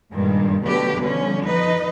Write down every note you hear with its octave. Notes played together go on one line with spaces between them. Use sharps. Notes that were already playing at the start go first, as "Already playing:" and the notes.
G2 A#2 D#3 G#3
B2 D3 F#3 A3 G4 B4
D3 F3 G3 C#4
F3 D#4 B4 D#5